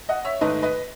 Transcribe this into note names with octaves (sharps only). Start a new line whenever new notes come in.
D#5 F#5
C#5 E5
G#2 D#3 A3 B4 D#5
B4 D#5